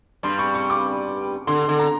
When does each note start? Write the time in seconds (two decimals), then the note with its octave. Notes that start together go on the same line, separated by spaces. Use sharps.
0.23 G2 G3 C6
0.39 C#6
0.55 C#6
0.70 D6
1.47 D3 C6
1.63 C6
1.68 D3
1.79 A#5